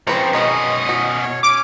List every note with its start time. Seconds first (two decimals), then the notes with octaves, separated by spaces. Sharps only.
0.07 C#3 F3 C4 B4 A#5
0.33 B2 D#3 G#3 B3 C#4 D#5
0.89 F#4
1.23 C#5
1.43 C#4 D6